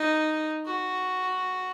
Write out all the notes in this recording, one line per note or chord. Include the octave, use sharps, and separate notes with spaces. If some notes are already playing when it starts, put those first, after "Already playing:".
Already playing: D#4
F#4